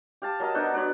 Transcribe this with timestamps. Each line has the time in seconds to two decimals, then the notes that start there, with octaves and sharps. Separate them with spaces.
0.22 G4 F5 A5
0.40 F#3 A#4 D#5 A5
0.55 B3 D4 D#4 F#4
0.74 D4 F#4 B4 C#5